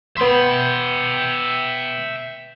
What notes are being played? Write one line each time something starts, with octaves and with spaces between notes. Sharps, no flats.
B3 E5 G5 C6